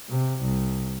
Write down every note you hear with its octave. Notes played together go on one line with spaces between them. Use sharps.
C3
C2